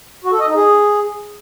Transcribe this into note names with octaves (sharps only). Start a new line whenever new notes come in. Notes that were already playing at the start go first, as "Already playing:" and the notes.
F#4
A4
D#5
D#4
G#4